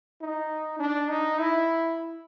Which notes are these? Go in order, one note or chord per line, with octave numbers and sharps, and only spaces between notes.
D#4
D4
D#4
E4